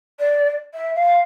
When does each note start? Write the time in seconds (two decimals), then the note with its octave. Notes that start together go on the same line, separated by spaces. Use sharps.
0.19 D5
0.74 E5
0.95 F5